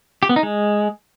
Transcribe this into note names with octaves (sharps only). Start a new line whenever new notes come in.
G4
B3
D#4
G#3